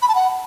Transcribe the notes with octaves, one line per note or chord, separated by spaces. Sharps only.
B5
A5
F#5